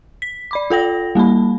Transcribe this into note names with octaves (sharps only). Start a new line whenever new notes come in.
B6
D5 B5 D6
F4 A4 G5 A#6
G3 A#3 A5 B5